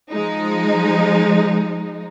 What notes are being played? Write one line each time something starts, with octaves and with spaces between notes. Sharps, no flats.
F3 G#3 D#4